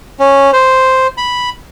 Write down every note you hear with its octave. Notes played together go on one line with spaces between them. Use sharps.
C#4
C5
B5